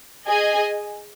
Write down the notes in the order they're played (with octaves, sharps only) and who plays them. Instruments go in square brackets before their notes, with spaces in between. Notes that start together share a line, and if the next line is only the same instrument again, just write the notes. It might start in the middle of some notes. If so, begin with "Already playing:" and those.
[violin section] G#4 D#5 G#5